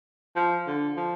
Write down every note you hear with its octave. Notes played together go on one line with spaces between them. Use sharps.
F3
D3
F3